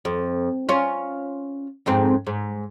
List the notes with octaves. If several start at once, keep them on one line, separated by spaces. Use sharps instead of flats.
F2
C#4 F4
F2 G#2 C4
G#2